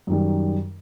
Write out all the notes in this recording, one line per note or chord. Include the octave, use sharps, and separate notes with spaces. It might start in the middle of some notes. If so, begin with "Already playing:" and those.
F#2 D#3 G3